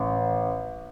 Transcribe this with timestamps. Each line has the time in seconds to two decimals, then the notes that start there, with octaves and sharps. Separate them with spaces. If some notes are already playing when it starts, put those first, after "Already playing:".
Already playing: A1